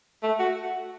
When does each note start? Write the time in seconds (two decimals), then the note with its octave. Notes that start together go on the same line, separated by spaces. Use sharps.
0.23 A3
0.39 F#4